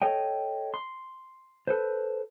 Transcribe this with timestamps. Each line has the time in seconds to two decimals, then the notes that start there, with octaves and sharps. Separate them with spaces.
0.02 A4 C#5 D#5 G5
0.74 C6
1.67 A4 B4 C5